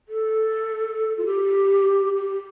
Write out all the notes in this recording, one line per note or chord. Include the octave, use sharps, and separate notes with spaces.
A4
F4
G4
G4